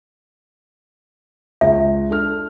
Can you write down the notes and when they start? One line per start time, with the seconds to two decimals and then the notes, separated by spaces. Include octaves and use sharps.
1.61 C#2 E5
2.09 D4 A4 F6